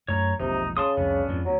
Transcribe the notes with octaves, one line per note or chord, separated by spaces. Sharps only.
F#2 A3 C#5 A#5
E1 A#1 C3 D#4
C#3 A5 C6 D#6
C2 F2 B3 C#4 D4
F2 G#2 F3
D2 F#3